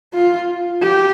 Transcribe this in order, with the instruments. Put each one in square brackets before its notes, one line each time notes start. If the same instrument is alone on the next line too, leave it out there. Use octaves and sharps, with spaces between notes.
[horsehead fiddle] F4
G4